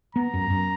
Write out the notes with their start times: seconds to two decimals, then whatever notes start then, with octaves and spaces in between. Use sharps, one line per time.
0.15 B3 A#5
0.34 F#2
0.50 F#2